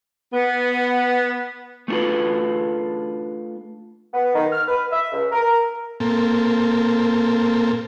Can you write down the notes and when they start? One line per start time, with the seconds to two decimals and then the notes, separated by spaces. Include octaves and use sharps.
0.33 B3
1.88 A3 B3 D4 F4 A4 B4
4.13 B3
4.34 D#3
4.52 F6
4.68 B4
4.91 E5
5.11 C#2
5.32 A#4
6.00 A#2 A#3 C4 A4